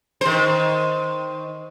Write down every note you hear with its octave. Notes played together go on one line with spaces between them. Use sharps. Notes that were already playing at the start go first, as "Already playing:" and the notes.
D#3 C5